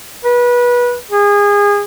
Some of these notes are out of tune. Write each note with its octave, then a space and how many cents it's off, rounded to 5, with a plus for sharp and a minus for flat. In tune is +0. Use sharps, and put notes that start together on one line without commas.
B4 -25
G#4 -30